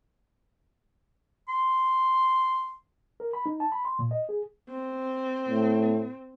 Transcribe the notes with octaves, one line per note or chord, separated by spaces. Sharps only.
C6
A#4
B5
D#4
A5
B5
C6
A#2
D#5
G#4
C4
A2